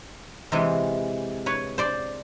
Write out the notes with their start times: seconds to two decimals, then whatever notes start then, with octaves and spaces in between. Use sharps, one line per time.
0.52 C3 E3 G#3
1.46 B4 C#5
1.78 C5 D5